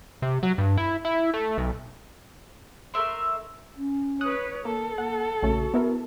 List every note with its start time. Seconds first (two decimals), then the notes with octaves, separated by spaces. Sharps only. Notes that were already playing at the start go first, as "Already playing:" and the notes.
0.22 C3
0.43 F#3
0.58 G2
0.78 E4
1.05 E4
1.34 A3
1.57 B1
2.94 A3 A#4 E5 C6
3.76 C#4
4.21 B4 C#5 D#6 F#6
4.65 A#3 A4 A#4
4.98 A#3 F#5
5.42 A#1 C#3 A3 F#4
5.74 B3 E4 A#4